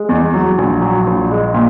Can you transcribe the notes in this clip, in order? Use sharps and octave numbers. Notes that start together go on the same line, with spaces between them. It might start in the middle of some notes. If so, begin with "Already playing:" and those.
Already playing: G#3
E2
F#3
A#1
F#3
A#1
G#3
A#2